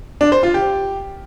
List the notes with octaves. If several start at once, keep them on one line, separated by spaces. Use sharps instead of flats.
D4
C5
F4
G4